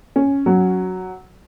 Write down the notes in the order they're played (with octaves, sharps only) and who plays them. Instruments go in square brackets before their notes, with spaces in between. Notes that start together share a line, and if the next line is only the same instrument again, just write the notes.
[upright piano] C#4
F#3